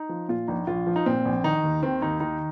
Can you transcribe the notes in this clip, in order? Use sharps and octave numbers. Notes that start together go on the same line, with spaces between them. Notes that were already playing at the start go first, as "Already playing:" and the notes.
Already playing: D#4
F3
A#2 F4
A#1 D#4
A#1 F4
F3
D#4
A#2 C4
A#1
D#3 D#4
D#2
D#3 C4
D#2 D#4
D#3 D#4